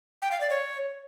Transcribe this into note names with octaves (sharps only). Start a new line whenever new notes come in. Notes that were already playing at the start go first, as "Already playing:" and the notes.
G5
F5
D5
C#5